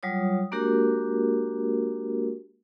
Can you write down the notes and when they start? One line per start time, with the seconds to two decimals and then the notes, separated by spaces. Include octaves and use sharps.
0.03 F#3 G3 F4 C#5 D#6
0.52 G#3 A#3 D4 F#4 G4 A#4